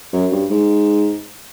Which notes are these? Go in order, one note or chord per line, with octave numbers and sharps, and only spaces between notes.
F#2
G2
G#2